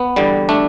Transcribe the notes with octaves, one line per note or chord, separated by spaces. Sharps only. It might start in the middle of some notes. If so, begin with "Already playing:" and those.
Already playing: B3
E2 D3 G3
A3 D4